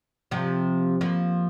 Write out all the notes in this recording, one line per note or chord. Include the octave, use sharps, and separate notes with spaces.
C3 F3
F3 A#3